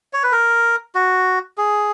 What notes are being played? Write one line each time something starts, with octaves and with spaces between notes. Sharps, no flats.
C#5
B4
A#4
F#4
G#4